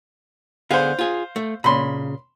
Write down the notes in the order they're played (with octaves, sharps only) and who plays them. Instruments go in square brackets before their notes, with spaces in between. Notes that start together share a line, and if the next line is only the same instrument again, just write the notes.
[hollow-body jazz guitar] D3 B3 G#4 [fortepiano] C5 F5
[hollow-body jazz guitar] F4 G#4
A3
[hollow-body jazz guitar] A#2 C#3 [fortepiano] B5 C6